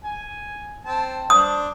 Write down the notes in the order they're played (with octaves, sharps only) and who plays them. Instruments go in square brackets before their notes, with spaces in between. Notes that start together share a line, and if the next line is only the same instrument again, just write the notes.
[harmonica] G#5
C4 A5
[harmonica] D4 C5 [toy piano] D#6